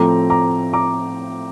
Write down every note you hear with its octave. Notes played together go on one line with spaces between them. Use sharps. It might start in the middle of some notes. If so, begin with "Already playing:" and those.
Already playing: A2 F3 A3 C4 A#5 D6
A#5 D6
A#5 D6